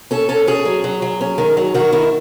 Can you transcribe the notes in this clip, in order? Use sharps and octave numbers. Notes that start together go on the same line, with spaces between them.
C#4 A4
C#4 A4
C#4 G#4
F#3
F#3
F#3
C#4
D#3
F#3
D#3 F#4
D#3 E4